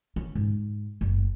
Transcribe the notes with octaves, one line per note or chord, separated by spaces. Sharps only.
C#4
G#2
F#1